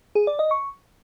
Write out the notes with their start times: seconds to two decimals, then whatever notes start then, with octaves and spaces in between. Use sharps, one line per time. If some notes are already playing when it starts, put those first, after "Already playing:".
0.15 G#4
0.27 D5
0.39 D#5
0.51 C#6